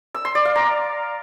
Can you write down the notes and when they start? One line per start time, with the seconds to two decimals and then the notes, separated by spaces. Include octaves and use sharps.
0.15 E6
0.25 C6
0.35 D5
0.45 F5
0.56 A#5